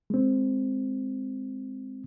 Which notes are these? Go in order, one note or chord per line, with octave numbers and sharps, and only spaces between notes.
G#3 C4